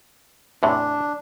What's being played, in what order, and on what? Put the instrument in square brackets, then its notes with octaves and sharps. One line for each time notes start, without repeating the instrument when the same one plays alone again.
[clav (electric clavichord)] E2 A2 C3 [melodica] D4